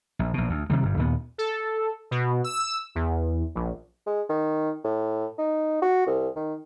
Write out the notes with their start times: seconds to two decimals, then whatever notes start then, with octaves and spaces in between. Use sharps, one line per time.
0.19 A#1
0.34 A#1 B2
0.50 D2
0.70 C3 D#3 G3
0.83 G1 G2
0.97 D#2 A#2 G#3 B3
1.38 A4
2.11 B2
2.44 E6
2.95 E2
3.55 A#1
4.06 G#3
4.29 D#3
4.84 A2
5.38 D#4
5.82 F#4
6.07 C2
6.36 D#3